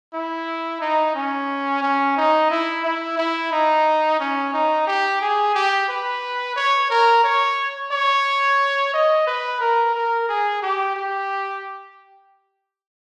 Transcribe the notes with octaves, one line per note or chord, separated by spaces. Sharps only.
E4
D#4
C#4
C#4
D#4
E4
E4
E4
D#4
C#4
D#4
G4
G#4
G4
B4
C#5
A#4
C#5
C#5
D#5
B4
A#4
A#4
G#4
G4
G4